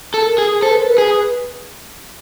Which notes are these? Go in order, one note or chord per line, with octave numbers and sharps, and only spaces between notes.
A4
A#4
G#4
A4 C5
B4
A#4
B4
G#4